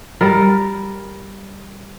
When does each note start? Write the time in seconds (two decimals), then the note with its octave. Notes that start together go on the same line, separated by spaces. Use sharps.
0.21 G3 A#4